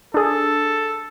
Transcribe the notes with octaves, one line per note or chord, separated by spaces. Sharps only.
D4 G#4 A4